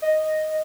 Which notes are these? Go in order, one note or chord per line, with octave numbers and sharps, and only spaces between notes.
D#5